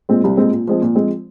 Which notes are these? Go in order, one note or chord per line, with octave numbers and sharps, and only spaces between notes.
A#2 G#3 C4
C2
A#2 G#3 C4
A#2
F3 G#3 C4
A#2
F3 G#3 C4